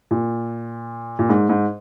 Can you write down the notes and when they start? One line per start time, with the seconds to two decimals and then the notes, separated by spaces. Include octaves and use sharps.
0.11 A#2
1.19 A#2
1.29 G#2
1.49 G#2